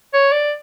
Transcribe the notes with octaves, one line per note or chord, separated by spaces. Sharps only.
C#5
D5